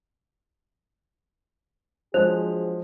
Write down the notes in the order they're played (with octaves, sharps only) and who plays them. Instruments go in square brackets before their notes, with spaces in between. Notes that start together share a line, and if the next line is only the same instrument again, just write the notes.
[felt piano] F3 G#3 [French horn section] F#3 D4 G#4 [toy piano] C5